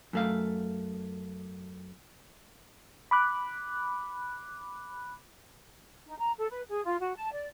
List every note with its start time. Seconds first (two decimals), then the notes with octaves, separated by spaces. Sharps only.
0.13 F#2 A3 F5
3.11 B5 D6 F#6
6.07 D#4
6.19 A#5
6.38 A4
6.50 B4
6.69 G#4
6.86 F4
7.00 F#4
7.17 A5
7.31 D5